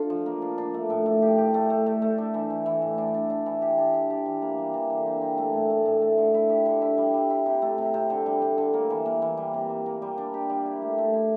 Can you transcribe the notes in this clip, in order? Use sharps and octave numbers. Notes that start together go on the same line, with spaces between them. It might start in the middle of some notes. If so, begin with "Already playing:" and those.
Already playing: D3 D4 F4
F3
A#3
D4
D4
A3
A2
A3
G4
G4
A3
A3
A3
A3
D4
E3
E3
E3
A2
D4
D4
D4
E3
G4
D4
D4
G4
E3
A#3
G3
E3
D3
C4
C4
A3
A2
A3
A2
A3
D3
E4
G4
D3
E4
G3
G3
E4
C3
A3
C3
C3
D3
G3
D3
D3
A#3
E3
A#3
E3
G3
C3
G3
A#3
G3
D4
G4
G3
E4
A3
A3
E4